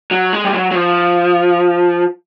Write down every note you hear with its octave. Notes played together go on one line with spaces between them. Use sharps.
F#3
G#3
G3
F#3
F#3
F3